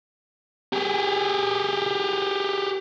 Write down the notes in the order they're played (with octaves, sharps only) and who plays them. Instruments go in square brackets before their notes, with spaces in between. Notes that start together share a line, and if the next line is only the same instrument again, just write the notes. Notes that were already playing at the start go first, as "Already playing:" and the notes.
[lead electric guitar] G4 G#4